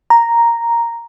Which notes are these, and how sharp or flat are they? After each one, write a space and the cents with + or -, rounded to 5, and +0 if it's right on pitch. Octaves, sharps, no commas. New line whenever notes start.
A#5 +0